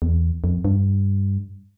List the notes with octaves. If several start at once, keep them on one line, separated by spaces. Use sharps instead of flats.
E2
F2
G2